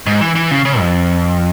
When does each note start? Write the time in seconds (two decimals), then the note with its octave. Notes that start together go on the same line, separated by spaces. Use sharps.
0.06 G#2
0.21 E3
0.35 E3
0.51 C#3
0.65 C#3
0.80 F2